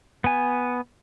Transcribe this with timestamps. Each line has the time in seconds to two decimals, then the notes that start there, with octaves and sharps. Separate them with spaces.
0.24 B3 G#5